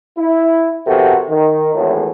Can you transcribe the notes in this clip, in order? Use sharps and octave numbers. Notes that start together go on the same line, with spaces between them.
E4
C3 F3 B3 F#4 A4 A#4
D#3
G#1 E2 A2